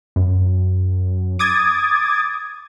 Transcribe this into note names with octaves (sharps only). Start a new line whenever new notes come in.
F#2
D6 D#6 G#6 A6